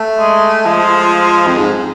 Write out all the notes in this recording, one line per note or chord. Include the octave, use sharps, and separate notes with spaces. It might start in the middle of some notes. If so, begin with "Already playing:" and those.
Already playing: A3
G#3
F3 G#3
F2
G#2